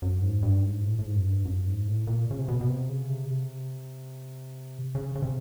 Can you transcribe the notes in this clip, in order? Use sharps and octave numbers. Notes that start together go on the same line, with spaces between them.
F#2
G#2
G2
G#2
A2
A2
G#2
F#2
G2
F#2
G#2
A2
A#2
C#3
C3
B2
B2
C3
C#3
C3
C#3
C3
C#3
C#3
C3